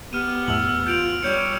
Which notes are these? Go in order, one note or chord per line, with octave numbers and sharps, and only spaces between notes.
B3 G4 F6 D#7
E2 A2 E6 F#7
F4 G6 D7 F7
G3 C#5 G6 C#7